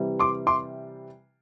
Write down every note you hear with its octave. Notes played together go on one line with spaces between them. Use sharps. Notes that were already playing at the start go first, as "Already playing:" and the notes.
Already playing: C3 E3 G3
C6 D6
C6 D6